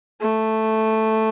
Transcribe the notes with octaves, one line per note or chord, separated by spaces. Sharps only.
A3